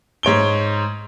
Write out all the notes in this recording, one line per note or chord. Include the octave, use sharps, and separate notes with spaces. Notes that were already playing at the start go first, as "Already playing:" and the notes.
G#2 C#5 D7 G7